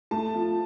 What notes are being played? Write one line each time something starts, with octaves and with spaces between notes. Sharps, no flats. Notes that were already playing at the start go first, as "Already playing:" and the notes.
A3 A5
F3